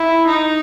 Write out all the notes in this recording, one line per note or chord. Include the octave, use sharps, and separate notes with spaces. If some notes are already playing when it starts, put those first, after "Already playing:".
Already playing: E4
D#4